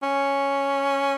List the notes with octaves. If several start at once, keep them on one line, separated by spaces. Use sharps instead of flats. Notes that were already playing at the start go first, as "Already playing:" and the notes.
C#4